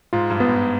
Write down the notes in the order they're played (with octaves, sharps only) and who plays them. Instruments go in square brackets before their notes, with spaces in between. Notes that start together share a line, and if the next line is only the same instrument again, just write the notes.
[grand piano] G#2 [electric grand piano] F4
[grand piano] G2
[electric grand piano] B3
[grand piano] G#2